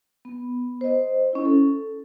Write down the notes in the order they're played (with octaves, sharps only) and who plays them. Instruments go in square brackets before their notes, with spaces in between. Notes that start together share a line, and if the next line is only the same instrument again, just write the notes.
[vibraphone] B3
C5 D#5
C#4 E4
A4